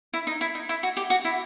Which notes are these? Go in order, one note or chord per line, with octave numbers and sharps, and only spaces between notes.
E4
D#4
E4
D#4
E4
F#4
G4
F#4
E4